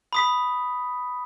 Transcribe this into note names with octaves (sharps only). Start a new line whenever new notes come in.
B5 D#6 B6